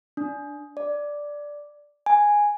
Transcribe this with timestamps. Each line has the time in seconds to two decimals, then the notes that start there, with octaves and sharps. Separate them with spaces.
0.17 D4
0.77 D5
2.06 G#5